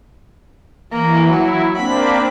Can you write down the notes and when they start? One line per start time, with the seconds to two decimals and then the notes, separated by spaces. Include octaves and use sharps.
0.92 E3 A#3
1.30 F#3 E4
1.77 A#3 C4 D4 B5